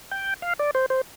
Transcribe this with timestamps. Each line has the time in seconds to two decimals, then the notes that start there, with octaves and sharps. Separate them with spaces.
0.11 G5
0.42 F5
0.59 D5
0.75 C5
0.90 C5